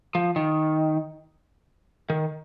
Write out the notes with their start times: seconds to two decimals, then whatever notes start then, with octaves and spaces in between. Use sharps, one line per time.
0.15 F3
0.36 D#3
2.10 D#3